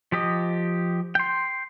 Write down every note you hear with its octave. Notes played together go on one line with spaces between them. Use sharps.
F3 G4 D#5
G5 C6